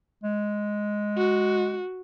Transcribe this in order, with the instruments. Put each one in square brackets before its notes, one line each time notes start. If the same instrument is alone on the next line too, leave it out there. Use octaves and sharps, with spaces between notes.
[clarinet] G#3
[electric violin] F#4